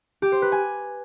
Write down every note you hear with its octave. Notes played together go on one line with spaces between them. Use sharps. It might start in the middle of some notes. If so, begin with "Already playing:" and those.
G4
C5
B4
G#5